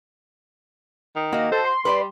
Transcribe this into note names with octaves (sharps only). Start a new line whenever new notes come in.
D#3
A#3 F#4 D#5
A4 C5
C6
G3 B4 C#5 D5